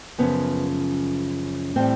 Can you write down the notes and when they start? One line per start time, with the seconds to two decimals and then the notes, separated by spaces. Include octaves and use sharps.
0.18 F#2 C#3 F3 B3
1.76 A2 E3 G3 C4